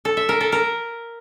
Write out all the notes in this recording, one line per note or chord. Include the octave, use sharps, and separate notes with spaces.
A4
E5
A#4
A4
A#4